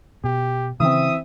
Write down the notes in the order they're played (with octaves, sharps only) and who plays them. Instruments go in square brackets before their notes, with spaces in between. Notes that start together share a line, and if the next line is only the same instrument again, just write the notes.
[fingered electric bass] B2 [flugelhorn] G4
[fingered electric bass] C#3 [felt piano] E3 C4 [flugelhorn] E5 [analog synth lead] D#6